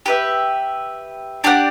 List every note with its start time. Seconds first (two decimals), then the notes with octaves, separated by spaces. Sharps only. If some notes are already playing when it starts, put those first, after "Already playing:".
0.06 G4 B4 E5
1.44 D4 G4 D5 F#5